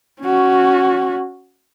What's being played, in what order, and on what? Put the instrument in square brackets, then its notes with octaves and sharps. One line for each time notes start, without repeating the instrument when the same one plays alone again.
[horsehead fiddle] C#4 F#4